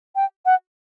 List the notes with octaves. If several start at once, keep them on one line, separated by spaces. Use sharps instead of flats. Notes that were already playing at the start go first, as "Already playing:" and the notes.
G5
F#5